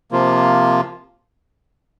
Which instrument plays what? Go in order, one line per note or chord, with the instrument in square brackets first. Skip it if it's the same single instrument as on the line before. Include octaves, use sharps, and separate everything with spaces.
[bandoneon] C3 F3 A#3 F4